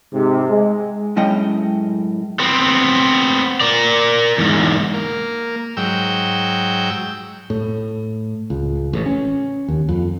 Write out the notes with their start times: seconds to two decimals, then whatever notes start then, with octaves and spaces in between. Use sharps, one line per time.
0.13 G#2 C3
0.48 G#3
1.16 F#2 A2 G#3 C#4 D#5 G5
2.40 B3 C4
3.61 A#4 D5
4.38 E2 G#2
4.94 A#3
5.77 G#2 F#3 G5 E6
7.50 A2
8.50 C#2
8.93 A1
9.06 C#4
9.68 D#2
9.89 F2